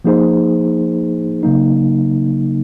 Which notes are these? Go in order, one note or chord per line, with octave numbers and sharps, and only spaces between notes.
F3 A#3 D#4 G#4 C5
C#3 F#3 A#3 D#4